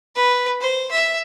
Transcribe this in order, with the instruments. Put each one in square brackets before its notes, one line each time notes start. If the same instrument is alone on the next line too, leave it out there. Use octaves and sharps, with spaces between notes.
[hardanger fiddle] B4
C5
E5